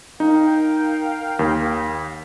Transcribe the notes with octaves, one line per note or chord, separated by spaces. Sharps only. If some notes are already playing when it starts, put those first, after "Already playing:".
D#4 A#4 F5 G5
D#2